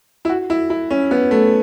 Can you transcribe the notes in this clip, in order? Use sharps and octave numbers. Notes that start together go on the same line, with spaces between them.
E4
F#4
E4
E4
C#4
B3
A3